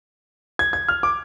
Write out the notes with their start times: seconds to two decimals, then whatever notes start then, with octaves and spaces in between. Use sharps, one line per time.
0.59 G#6
0.73 G#6
0.88 F6
1.03 D6